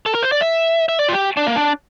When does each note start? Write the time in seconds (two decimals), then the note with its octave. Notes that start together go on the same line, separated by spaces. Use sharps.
0.06 A4
0.15 A#4
0.23 C5
0.32 D5
0.41 E5
0.89 E5
0.99 D5
1.09 F4
1.13 G4
1.37 D4
1.46 A#3
1.56 D4